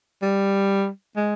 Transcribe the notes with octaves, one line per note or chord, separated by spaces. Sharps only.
G3
G#3